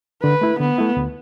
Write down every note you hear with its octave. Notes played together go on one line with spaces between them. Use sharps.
D3 B4
A3 E4
D3 B3
A3 E4
D2